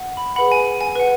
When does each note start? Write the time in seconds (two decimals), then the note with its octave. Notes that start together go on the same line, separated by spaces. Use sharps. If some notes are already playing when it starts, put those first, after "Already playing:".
Already playing: F#5
0.17 B5
0.36 G#4 B4 F#5 B5
0.52 G#5
0.81 G#5
0.96 B4 F#5